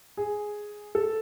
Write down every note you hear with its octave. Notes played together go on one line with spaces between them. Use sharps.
G#4
A4